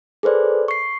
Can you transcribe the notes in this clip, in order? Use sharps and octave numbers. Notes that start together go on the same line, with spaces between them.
G#4 A4 B4 C5 D5
C#6 C7